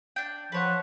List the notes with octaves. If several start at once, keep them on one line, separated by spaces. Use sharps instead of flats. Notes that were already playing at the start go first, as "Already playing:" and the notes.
D4 G5
F3 B4 C#5 F#5